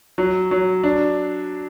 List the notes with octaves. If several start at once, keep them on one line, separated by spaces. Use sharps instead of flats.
F#3
F#3
D4